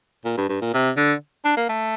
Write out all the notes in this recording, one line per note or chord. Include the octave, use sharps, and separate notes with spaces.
A#2
G2
G2
A#2
C3
D3
D4
A#3
A3